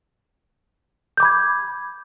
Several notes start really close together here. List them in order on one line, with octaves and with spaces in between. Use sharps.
G6 D6 B5 G#6